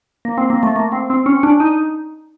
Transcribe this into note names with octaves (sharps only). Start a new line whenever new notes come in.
A#3
C4
A#3
A3
A#3
C4
C4
C#4
D4
D#4